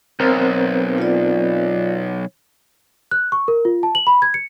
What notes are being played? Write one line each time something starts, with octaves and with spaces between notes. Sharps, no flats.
B1 C4 A#4 C5
F4 D5
F#6
C#6
A#4
F4
A5
F#7
B5
G#6
C#7